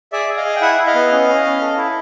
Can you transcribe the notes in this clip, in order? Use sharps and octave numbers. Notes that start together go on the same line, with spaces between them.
G#4 D5 E5
G#4
D#5 F5
G#4
G5
E4 E5 F#5
E4
D#5 F5
B3
C#4
C#4
C#4
A4
E4